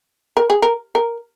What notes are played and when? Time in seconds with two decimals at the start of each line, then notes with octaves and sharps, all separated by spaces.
0.37 A#4
0.50 G#4
0.62 A#4
0.95 A#4